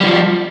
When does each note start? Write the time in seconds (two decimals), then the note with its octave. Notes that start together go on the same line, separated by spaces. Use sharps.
0.01 G3
0.03 E3
0.06 F3